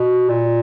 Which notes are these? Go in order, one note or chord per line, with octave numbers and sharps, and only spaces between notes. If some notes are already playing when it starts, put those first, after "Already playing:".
Already playing: B2
A#2